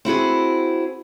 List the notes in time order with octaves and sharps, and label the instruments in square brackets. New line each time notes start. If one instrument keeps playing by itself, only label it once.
[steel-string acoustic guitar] C4 E4 F#4 G#4